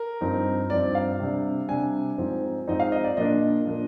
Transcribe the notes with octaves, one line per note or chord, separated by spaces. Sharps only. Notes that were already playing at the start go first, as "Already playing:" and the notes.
Already playing: A#4
G2 F3 C4 D#4
G2 F3 C4 D#4 D5
F5
C3 G3 D4
C3 G3 D4 G#5
G#2 F3 C4 D#4
G#2 F3 C4 D#4 D#5
F5
D#5
D5
A#2 F3 A#3 D4 D#5
A#2 F3 A#3 D4